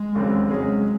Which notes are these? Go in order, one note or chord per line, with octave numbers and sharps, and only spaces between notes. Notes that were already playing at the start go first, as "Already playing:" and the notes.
Already playing: G#3
E1 D#2 C#3 F#3 C4
C3 F#3 G#3 C#4 G#4